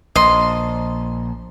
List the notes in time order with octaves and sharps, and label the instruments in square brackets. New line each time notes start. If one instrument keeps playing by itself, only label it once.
[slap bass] A#1 [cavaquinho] D#5 C6